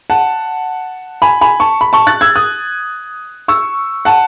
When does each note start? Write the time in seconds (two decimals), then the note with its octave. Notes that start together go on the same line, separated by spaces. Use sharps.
0.10 F#5 A5
1.22 G#5 B5
1.41 G#5 B5
1.60 A5 C#6
1.81 B5
1.93 A5 C#6
2.07 F#6 A6
2.21 E6 G#6
2.35 D#6 F#6
3.48 C#6 E6
4.05 F#5 A5